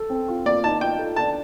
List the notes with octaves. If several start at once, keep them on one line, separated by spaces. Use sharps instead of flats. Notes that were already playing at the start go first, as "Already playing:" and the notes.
Already playing: A4
C4
F4
A#3 D5
D#4 A5
F4 G5
A4
D4 A5